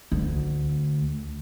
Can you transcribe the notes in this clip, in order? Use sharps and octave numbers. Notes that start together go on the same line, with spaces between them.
D2